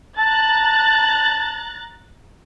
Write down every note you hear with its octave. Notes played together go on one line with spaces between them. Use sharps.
A5 A#5 F#6 A6